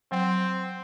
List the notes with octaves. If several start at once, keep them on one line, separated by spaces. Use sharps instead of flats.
F#3 C4